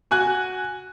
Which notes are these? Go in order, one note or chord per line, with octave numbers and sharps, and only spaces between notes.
F#4 G#5 F#6